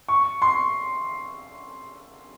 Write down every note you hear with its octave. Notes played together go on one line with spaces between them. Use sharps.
C#6
C6